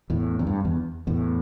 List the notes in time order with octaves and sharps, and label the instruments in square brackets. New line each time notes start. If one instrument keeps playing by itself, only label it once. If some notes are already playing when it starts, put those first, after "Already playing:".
[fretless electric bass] E2 A2
E2
G2
E2
E2 A2